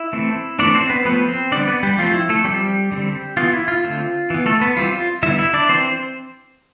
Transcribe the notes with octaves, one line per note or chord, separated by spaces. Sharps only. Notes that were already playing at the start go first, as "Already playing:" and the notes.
Already playing: E4 E5
E3 A3 C4
E3 A3 C4 D4 D5
C4 C5
B3 B4
F3 A3 B3 C4 B4
C4 C5
D3 G3 B3 D4 D5
B3 B4
G3 G4
F3 A3 C4 F4
E4
A3 A4
F3 G3 C4 G4
D3 G3 C4
E3 B3 F4
E4
F4
D3 A3 C4
E3 B3
A3 A4
B3 B4
E3 G3 C4 F4
F4
D3 G3 B3 E4 E5
E4 E5
D4 D5
E3 C4 C5